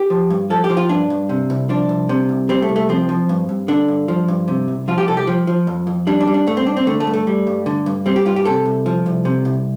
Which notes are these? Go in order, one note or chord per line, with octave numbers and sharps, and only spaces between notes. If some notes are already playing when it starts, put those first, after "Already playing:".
Already playing: G4
F3
G2
F3 A4
G4
F3
F4
G2 D4
G2
C3
C2
F3 D4
C2
C3
C2
G3 C4
A3
C2
A3
F3 C4
F3
G2
G2
D3 D4
G2
F3
G2
C3
C2
F3 F4
G4
C2 A4
G4
F3
F3
F2
F2
G3 D4
D4
G3
D4
G2 A3
C4
G2 D4
C4
D3 A3
A3
G2
A3
G3
G2
D3
G2
G3 C4
G4
G2 F4
G4
C3 A4
C2
F3
C2
C3
C2